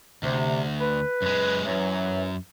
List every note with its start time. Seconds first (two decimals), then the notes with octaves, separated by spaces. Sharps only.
0.23 D2 C3
0.81 B4
1.22 F#2 G#3
1.66 F#2 E3 F#3